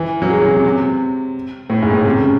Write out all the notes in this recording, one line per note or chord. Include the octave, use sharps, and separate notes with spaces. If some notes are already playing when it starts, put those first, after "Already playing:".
Already playing: E3
F#3
G#3
F#3
C3
C3
A2
G#2
A2
C3
C#3